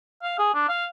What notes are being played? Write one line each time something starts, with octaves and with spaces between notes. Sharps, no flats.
F5
G#4
D4
F5